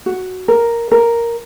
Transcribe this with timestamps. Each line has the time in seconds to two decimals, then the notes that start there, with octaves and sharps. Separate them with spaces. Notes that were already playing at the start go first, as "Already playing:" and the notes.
0.06 F#4
0.48 A#4
0.92 A#4